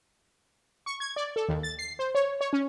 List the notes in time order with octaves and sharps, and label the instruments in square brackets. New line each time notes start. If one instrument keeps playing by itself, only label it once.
[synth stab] C#6
G#6
D5
A4
D#2
A6
C7
C5
C#5
C#5
C#4